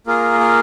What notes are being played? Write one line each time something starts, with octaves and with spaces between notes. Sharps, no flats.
A#3 F4 G#4 A#4
A#4